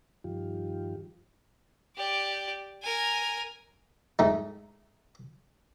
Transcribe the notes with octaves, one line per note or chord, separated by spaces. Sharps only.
G2 D#3 F3 F4 G4
G4 D5
A#4 G#5
G#2 A3 D#4